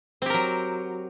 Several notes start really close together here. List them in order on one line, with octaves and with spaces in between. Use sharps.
C4 G4 A#4 F#3